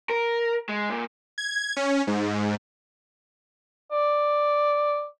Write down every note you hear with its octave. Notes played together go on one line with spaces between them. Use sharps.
A#4
G#3
A#2
G#6
C#4
G#2
D5